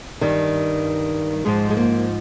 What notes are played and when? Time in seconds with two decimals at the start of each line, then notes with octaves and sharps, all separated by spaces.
0.21 G2 D#3 G3
1.45 G#2 F3 G#3
1.70 G#3
1.77 A#3